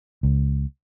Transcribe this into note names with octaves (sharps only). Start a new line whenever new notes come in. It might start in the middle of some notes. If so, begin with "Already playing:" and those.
C#2